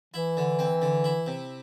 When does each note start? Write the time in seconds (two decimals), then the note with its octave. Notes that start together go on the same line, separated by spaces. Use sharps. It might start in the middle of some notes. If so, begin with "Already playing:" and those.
0.14 E3 E4
0.37 D3
0.59 C4
0.82 D3
1.04 E4
1.26 C3